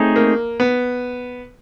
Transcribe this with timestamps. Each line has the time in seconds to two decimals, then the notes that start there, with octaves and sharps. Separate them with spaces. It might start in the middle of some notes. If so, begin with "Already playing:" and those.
Already playing: A3 C4 D#4 G#4 C#5
0.16 A#3
0.60 B3